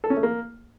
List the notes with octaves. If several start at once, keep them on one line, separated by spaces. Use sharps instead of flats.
A4
C#4
A3
A#3